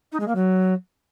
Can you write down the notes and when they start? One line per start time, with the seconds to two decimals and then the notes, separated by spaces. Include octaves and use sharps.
0.12 D#4
0.20 G#3
0.27 A#3
0.35 F#3